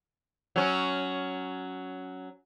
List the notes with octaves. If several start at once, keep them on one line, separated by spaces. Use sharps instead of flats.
F#3 C#4